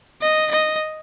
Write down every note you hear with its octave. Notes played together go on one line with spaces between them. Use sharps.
D#5
D#5